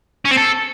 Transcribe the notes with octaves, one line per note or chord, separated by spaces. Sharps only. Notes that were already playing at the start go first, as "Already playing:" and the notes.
C#4
C4
A4